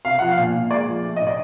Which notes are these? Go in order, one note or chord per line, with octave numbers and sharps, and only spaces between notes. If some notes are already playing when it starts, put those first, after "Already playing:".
C3 F5
F3 F#5
F5
A#2
A#2
G#3 D5
F3
A3
A2 D#5
D5